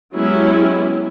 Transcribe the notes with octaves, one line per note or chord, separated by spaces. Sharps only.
F#3 G#3 B3 C#4 E4 G4